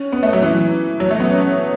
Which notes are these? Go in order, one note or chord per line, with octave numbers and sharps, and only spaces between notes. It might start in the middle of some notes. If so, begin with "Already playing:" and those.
Already playing: C#4
B3
A3
F#3
E3
F#3
A3
B3
C#4